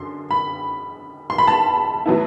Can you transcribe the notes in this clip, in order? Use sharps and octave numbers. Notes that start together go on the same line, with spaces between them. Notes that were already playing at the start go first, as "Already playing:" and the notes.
Already playing: F#2 D3 C6
B5
C6
B5
A5
A2 F#3 B3 E4